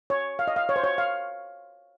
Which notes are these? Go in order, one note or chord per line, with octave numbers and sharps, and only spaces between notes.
C#5
F5
D#5
F5
C#5
C5
C#5
F5